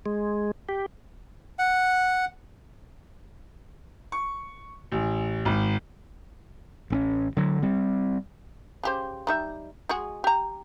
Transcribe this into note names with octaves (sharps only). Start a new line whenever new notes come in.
G#3
G4
F#5
C#6
A1
G#1
A1 C4 C#4
D3 F#3
G3 C4
C#3 G4 C5
G3 D#4 E5
G#3 F#4 G#4
G4 A#5